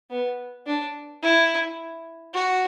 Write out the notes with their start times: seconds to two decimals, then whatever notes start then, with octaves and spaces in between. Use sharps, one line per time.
0.10 B3
0.67 D4
1.23 E4
2.34 F#4